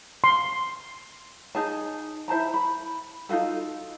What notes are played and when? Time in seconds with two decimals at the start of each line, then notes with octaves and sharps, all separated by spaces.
0.24 C6
1.55 D#4 G#4 A5
2.28 E4 C5 A5 A#5
2.54 B5
3.29 D#4 F4 F#4 A4